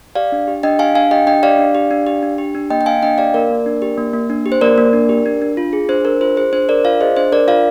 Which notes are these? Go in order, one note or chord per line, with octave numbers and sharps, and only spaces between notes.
G4 D5 F5
D4
G4
D4 D#5 G5
G4 F5 G#5
D4 F5 G#5
G4 D#5 G5
D4 D#5 G5
G4 D5 F5
D4
G4
D4
G4
D4
G4
D4
A#3 D#5 G5
G5
A#3 F5 G#5
D4 D#5 G5
G4 D5 F5
A#3 A#4 D5
A#3
D4
G4
A#3
A#3
D4
G4
C5
A#3 A#4 D5
A#3
D4
G4
D4
D4
F4
G#4
D4 C5
D4 A#4
F4 C5
G#4 C5
D4 C5
D4 A#4 D5
F4 D5 F5
G#4 C5 D#5
D4 C5
D4 A#4 D5
F4 D5 F5